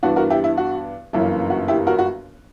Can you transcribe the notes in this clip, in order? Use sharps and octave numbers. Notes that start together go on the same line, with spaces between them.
G2 E3 B3 D4 F#4
F#4 A#4
E4 G4
E4
F#4
G1 F#2 C#3 E3 A#3 E4
F#4
E4 G4
F#4 A#4
F#4